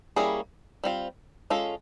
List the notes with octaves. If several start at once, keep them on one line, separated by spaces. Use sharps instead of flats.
G3 A#3 C#4 E4 G#4
G3 C4 F4
G#3 C#4 F4 A4